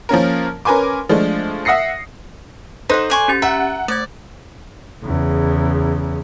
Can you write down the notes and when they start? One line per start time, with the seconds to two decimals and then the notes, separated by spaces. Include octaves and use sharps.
0.09 F3 A#3 C#4 A#4
0.65 C#4 A#4 B4 G#5 C6 D6
1.09 F3 G#3 A3 D4
1.65 E5 F#5 D#6 A#6 C7 C#7
2.90 D#4 A4 C5 F#5 F#6
3.10 D5 G#5 C#6
3.28 C#4 G4 A6
3.42 E5 F#5 A#5
3.88 A3 C5 D5 G#6
5.04 E2 C#3